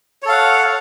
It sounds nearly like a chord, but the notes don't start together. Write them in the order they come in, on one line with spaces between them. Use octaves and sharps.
C#5 A4 F5 F#5